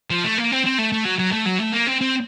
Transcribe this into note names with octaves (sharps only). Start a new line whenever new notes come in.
F3
A3
A#3
C4
C4
A3
A3
F#3
F#3
A3
F#3
A3
A#3
C4
C4